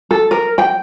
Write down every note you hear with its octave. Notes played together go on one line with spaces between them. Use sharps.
A4
A#4
G5